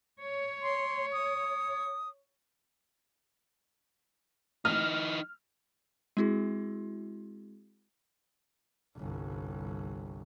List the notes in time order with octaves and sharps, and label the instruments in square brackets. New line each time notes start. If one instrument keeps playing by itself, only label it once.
[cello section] C#5
[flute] C6
D#6
[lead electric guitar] E3 D#4 [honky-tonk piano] F6
[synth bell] G#3 C4 E4 F#4 G#4
[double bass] G1 C2